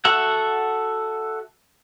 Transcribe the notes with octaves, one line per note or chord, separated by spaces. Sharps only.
F#4 A4 E5 F#5